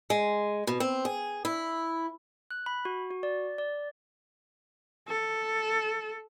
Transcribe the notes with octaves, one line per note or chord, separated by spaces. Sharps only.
G#3
B2
C4
G#4
E4
F#6
B5
F#4
F#4
D5
D5
A4